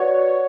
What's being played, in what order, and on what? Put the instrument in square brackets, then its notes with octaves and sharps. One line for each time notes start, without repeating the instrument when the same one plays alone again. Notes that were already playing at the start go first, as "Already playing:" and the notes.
Already playing: [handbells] F#4 B4 D5 F#5 [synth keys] C#5